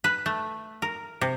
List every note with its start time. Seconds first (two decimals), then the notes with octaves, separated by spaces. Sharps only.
0.04 B4
0.26 A3
0.82 A#4
1.21 C3